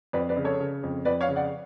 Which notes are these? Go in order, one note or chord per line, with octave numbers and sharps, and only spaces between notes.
F2 B4 D5
B4 D5
C#3
A4 C#5
C#3
F2
F2 B4 D5
C#5 F5
C#3
D5 F#5